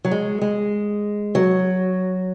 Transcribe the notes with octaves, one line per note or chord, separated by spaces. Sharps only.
F#3
G#3
G#3
F#3